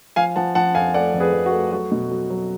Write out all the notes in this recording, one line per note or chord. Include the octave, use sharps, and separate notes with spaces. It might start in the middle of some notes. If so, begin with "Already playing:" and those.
F3 F5 G#5
F3 F#5 A5
F3 F#5 A5
F2 F5 G#5
A3 D5 F#5
F2
G#4 B4
F2
F#4
A3
F#3 F#4
B2
F#3
F#3